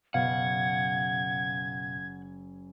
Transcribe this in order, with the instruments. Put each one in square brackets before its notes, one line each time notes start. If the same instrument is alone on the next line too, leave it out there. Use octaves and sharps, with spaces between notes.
[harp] F#1 [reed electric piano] B2 F5 [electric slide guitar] F#5 [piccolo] G#6